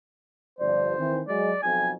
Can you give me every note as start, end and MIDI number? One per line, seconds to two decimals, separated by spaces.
0.59 0.95 31
0.59 0.95 41
0.59 1.22 72
0.59 0.95 74
0.98 1.20 51
0.98 1.20 52
0.98 1.20 60
1.28 1.51 54
1.28 1.51 56
1.28 1.61 74
1.62 1.91 35
1.62 1.91 41
1.62 1.89 80